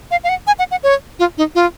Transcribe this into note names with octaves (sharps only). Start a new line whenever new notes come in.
F5
F5
F#5
G#5
F#5
F#5
C#5
F4
D#4
F4